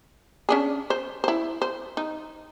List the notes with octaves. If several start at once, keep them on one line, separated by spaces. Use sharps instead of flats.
C#4 D4 G#4
C5
E4 C5
C5
D#4